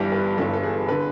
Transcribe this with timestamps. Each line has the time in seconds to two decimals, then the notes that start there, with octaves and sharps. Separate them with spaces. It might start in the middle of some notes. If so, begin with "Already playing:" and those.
Already playing: G1 G2 E3 G3 B4
0.12 B4
0.37 G1 G2 E3 G3 A4
0.53 A4
0.63 G#4
0.88 D3 B4